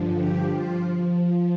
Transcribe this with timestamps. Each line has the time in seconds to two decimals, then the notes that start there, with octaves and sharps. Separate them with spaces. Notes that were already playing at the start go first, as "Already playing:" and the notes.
Already playing: G2 D3 F3
0.15 G4
0.48 F3 F4